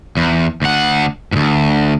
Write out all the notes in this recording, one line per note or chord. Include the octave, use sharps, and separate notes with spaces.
E2
D2 F#5
D2 G#2